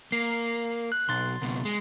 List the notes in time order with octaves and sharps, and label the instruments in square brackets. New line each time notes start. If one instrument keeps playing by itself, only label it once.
[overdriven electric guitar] A#3 [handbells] C7
[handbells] F#6
[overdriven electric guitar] B1 [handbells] C6 A6
[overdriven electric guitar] C#2 B2
G#3